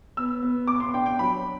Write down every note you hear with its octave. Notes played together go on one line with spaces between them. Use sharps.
B3 E6
B3
B3 D6
C6
D4 G5
G5
F#3 B5